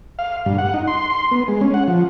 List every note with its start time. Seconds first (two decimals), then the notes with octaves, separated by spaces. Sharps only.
0.19 F5
0.46 G2
0.58 F#5
0.74 D#4
0.87 C6
1.10 C6
1.31 B3
1.48 G#3
1.61 C#4
1.74 F#5
1.88 F3